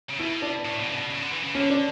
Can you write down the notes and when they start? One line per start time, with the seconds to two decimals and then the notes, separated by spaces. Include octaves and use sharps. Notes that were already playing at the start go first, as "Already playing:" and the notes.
0.10 C#3
0.19 B2 E4
0.42 D4
0.65 A2
0.80 B2
0.88 C#3
0.95 B2
1.10 C#3
1.21 D3
1.32 E3
1.44 C#3
1.55 D3 C#4
1.70 D4